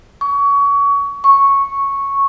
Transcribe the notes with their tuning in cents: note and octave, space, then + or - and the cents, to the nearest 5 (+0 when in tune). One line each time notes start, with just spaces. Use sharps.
C#6 +25
C#6 -5